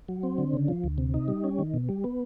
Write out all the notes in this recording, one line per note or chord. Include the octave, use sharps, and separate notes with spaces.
F#3
C4
D3
C#3
F3
D2
C3
D#4
G3
C#4
D#3
B2
G3
B3